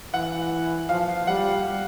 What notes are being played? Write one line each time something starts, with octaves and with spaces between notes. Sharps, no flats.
E3 F#5
F3 F5
G3 F#5